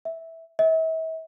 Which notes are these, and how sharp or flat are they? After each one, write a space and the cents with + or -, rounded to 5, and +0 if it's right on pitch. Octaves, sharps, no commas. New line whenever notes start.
E5 -10
E5 -40